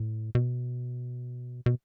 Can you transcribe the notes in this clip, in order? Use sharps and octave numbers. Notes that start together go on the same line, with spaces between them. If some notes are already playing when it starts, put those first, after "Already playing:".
Already playing: A2
B2
B2